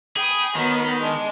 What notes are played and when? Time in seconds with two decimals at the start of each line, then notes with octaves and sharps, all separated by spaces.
0.17 G#4 G5 B5 D#6
0.55 D#3 F#3 B3 B5
0.97 G#3 D4